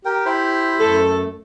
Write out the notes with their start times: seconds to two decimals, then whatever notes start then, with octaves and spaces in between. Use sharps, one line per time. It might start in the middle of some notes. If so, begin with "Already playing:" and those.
0.05 G4 A#4 G5
0.25 E4 C5 B5
0.80 F#2 A3 A4